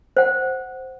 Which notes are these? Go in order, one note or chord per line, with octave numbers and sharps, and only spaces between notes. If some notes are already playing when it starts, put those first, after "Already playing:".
C5 F#5